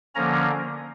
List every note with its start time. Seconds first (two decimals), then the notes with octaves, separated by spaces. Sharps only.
0.15 D3 F3 A#3 C#4 A#5